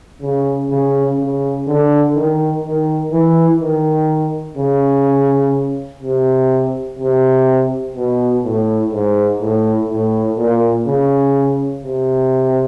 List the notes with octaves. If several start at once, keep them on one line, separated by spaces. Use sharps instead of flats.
C#3
C#3
C#3
D3
D#3
D#3
E3
D#3
C#3
C3
C3
B2
A2
G#2
A2
A2
A#2
C#3
C3